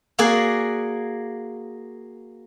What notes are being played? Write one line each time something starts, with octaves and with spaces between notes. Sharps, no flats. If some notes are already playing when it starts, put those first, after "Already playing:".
A#3 F#4 G#4 D5